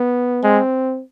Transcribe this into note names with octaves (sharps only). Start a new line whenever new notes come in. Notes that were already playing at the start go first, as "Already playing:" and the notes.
Already playing: B3
G#3 C4